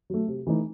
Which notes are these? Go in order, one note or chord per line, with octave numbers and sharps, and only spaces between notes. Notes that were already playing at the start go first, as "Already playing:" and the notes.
F#3 A3
C3
E3 A3 D#4